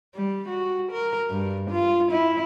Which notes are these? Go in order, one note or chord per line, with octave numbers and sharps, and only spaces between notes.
G3
F#4
A#4
G2
F4
E4